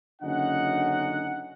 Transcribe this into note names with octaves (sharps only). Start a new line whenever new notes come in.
F#1 D3 C#4 D#4 F#5